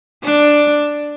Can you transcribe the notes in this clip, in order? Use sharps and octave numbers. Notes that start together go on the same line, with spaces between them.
D4